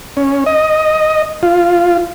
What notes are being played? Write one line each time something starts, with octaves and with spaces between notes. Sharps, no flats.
C#4
D#5
F4